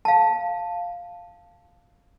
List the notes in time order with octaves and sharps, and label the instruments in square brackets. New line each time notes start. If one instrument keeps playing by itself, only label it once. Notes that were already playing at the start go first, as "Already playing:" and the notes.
[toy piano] F5 A5